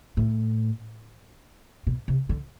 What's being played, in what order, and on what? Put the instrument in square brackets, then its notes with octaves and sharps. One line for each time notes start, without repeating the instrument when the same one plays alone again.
[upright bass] A2
B2
C3
D3